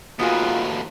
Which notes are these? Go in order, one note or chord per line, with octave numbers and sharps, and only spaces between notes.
D#2 A2 B3 F4 F#4 G#4